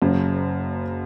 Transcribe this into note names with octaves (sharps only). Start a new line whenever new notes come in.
F#1 F#2 C#3